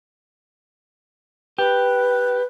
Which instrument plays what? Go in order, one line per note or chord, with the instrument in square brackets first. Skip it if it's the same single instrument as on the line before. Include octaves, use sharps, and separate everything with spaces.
[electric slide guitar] G4 [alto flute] B4